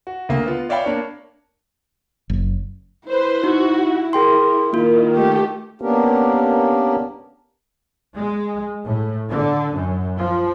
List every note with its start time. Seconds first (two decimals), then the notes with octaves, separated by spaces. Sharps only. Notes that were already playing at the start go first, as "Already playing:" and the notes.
0.07 F#4
0.29 D2 A#3
0.46 B3 F4
0.69 C#5 D5 E5 F5 G5 B5
0.85 A#3 D4 C#5
2.30 F#1
3.08 E4 B4 C5
3.44 D#4 F#4
4.13 G#4 A#4 G5 C6
4.73 D#3 A#3 F4
5.13 A3 G4
5.82 A#3 B3 C#4 D4 G4 A#4
8.14 G#3
8.84 A2
9.29 D3
9.74 F#2
10.17 F3